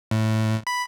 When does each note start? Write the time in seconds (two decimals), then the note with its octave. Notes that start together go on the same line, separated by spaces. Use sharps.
0.11 A2
0.67 B5